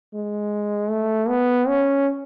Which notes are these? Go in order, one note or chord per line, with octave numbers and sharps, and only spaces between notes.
G#3
A3
B3
C#4